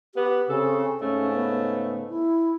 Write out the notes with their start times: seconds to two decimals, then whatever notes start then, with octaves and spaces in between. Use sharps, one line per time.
0.15 B3 G4
0.48 C#3 C4 A4
1.01 G#2 C#3 A3 C#4
1.35 B3
2.09 E4